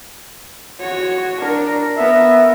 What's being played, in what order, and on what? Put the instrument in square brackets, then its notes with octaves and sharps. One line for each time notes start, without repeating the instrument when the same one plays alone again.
[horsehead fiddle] F#4 C#5
D4 A#4
[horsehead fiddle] B3 A#4 [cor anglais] E5